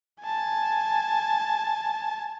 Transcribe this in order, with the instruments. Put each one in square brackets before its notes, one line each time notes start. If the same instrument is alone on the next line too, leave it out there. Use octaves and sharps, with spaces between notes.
[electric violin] G#5 A5